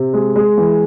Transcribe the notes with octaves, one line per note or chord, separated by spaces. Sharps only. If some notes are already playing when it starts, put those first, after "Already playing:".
Already playing: C3
G#3
G#3
E3